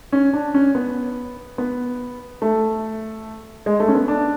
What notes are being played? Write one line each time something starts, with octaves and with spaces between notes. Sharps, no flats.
C#4
D4
C#4
B3
B3
A3
G#3
A3
C#4
B3
D4